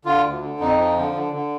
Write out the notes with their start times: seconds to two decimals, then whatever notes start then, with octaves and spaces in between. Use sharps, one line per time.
0.05 D3 F4
0.24 D2
0.41 D3
0.60 F2 D#4
0.78 F3
0.97 D3
1.14 D3
1.33 D3